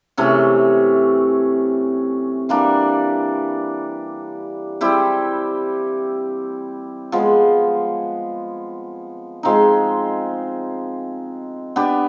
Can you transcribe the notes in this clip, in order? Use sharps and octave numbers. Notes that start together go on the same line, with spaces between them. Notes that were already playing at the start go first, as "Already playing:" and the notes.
C3 E3 A3 C#4
E3 G3 A#3 D4
G3 C4 E4 G4
F3 G#3 B3
F3 G#3 C4 D#4
B3 D4 G4